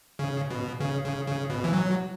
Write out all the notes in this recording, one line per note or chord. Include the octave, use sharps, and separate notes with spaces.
C#3
B2
C#3
C#3
C#3
B2
E3
F#3